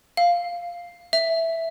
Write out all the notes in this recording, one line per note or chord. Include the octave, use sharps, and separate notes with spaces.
F5
E5